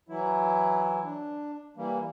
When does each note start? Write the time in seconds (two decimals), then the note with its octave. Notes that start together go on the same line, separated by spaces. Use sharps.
0.09 E3 F#3 E4
1.04 D4
1.77 E3 G3 A#3